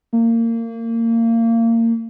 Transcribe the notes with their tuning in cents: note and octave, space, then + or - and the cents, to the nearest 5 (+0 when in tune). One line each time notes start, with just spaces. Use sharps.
A#3 -25